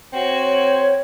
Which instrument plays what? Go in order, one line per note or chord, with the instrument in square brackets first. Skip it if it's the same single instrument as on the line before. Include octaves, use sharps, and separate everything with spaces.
[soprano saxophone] C4 [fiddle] F#4 [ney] C#5